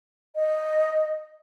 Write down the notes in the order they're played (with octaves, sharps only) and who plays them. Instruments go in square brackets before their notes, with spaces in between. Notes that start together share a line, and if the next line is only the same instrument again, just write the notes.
[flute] D#5